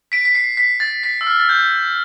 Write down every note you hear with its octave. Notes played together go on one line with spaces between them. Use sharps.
B6 D7
B6
C7
B6
A6
B6
E6
F6
A6
G6